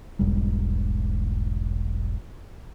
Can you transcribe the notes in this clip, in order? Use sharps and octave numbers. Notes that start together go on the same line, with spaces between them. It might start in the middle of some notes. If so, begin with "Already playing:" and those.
E1 B1 G#2 G3